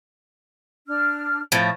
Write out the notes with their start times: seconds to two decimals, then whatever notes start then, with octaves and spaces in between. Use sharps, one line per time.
0.87 D4 F6
1.52 A2 F3